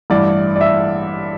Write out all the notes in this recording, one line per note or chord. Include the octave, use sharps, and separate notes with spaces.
A1 G2 E3 D5
D5
E5